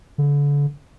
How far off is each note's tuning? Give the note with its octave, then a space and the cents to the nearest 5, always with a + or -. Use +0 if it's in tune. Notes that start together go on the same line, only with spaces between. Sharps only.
D3 -35